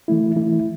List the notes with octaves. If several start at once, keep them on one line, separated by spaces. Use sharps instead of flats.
E3 A3 E4
E3 A3 E4